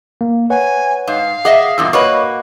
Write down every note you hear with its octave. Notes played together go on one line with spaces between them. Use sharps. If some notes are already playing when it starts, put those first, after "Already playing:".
A#3
B4 C#5 F#5 G#5
G#2 F5
G#4 D#5 E5 F#5 D6
E2 G2 A#2 D#6 E6
A#3 F#4 B4 C#5 D#5 C#6